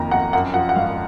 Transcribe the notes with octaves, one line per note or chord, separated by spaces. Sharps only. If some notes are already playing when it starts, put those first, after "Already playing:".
Already playing: F2 D#3 A#3 A#5
F2 F#5
F#2 F#5
F3 F#5
F#5
G#1 F5